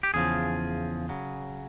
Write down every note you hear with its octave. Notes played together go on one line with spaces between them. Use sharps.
G4
E2 C#3 F3 G#4
C#3 F#3